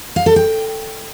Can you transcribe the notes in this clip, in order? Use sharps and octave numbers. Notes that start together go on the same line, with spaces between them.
F5
A4
G5